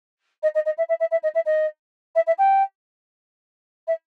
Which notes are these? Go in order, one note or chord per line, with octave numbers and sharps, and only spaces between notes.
D#5
D#5
D#5
E5
E5
E5
E5
D#5
E5
D#5
E5
E5
G5
E5